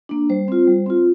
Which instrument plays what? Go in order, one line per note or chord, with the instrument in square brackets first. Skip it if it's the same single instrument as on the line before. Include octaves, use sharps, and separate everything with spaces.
[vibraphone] A#3 D4
G3 C5
C4 F4
G3
C4 F4